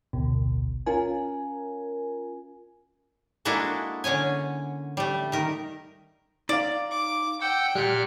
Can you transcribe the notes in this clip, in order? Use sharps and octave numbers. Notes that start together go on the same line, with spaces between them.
A1 D2 B2
C#4 F4 A#4 G#5
G#3 A#3 D4 E4 F#4 A4
D3 C#4 C#5 G#5
G3 A3
D#3 A#4
D#4 D5 F5
D6
F#5 G5 E6 G6
A#2 G3 G4 F6 F#6